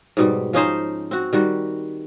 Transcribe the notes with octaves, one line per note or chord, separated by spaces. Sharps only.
G#2 B2 G3
F3 C#4 D#4 C5
C4 F#4
D#3 G3 F#4